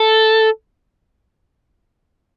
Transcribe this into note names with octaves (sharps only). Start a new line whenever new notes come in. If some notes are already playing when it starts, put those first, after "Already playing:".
Already playing: A4